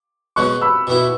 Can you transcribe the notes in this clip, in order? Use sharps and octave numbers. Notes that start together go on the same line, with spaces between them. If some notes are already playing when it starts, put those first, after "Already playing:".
B2 G#3 C#4 C#6 F#6
B5 E6
B2 B3 E4